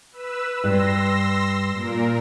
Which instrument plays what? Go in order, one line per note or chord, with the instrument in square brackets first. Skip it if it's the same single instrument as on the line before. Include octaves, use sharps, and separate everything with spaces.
[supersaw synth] B4 E6
[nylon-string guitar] G2 [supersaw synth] C6 E6 A#6
[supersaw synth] A#2 A#4